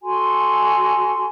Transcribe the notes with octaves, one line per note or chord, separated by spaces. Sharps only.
F#4 A4 G#5 C6